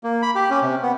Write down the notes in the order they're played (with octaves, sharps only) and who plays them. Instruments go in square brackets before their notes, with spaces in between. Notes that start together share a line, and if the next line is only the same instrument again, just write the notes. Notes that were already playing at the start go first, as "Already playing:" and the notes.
[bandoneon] A#3
B5
G4
C#4
C3
B3